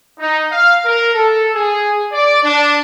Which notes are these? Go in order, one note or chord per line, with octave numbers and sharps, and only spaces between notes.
D#4
F5
A#4
A4
G#4
D5
D4